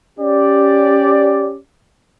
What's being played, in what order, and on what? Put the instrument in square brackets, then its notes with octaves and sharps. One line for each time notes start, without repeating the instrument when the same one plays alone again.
[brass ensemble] C#4 G4 D5